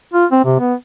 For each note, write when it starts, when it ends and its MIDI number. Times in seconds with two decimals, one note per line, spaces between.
0.14 0.26 65
0.31 0.41 60
0.44 0.55 48
0.60 0.74 59